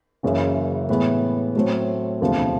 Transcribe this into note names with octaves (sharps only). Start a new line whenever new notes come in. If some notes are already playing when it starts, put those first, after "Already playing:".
F#1 F#2 C#3 E3
A2 E3 G#3 B3
A2 F#3 A3 C4
E1 D2 C3 F3